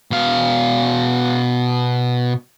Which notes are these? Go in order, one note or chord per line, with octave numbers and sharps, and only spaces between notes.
B2 F5